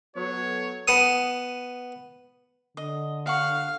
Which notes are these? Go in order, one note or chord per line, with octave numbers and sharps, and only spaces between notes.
F#3 B3 F#4 A4 C#5
B3 A5 D#6
D3 D#5
F5 F#5 C#6